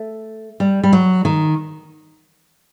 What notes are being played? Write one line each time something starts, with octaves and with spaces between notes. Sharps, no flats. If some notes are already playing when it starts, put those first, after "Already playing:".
Already playing: A3
G3
G3
F#3
D#3